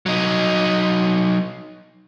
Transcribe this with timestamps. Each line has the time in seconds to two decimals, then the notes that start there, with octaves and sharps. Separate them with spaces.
0.06 F#3 D#4